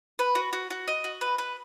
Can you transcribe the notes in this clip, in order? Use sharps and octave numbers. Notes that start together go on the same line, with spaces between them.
B4
F#4
F#4
F#4
D#5
F#4
B4
B4